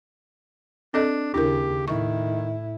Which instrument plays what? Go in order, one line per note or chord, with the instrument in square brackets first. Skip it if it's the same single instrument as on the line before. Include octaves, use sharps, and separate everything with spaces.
[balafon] C4 A4 D#5 [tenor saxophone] D4
[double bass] D#2 C#3 [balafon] D4 E4 A#4 [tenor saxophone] G4
[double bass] A2 E4 [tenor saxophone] D#3 [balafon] C#6